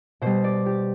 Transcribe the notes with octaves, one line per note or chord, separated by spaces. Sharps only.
B2 G3 C5
D5
G4